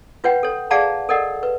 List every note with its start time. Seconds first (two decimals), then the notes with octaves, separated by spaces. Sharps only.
0.24 F4 B4 C#5 F#5 G5
0.43 A4 C#5
0.71 G#4 D5 F5 F#5 A5 A#5
1.09 A4 A#4 D5 D#5 F#5
1.43 B4